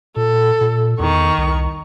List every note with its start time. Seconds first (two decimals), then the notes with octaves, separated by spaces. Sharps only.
0.16 A#2 A4
0.61 A#2
1.00 E2 D#3 C#6
1.38 C2